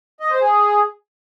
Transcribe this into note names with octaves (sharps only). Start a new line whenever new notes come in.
D#5
C5
G#4